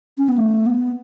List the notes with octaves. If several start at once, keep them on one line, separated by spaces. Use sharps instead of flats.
C#4
B3
A3
B3